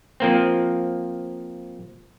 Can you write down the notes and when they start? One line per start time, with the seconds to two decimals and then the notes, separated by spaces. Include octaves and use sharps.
0.20 F3 A#3 C4